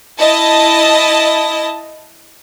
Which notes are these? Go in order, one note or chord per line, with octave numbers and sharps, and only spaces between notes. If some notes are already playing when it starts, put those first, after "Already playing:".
E4 D#5 A5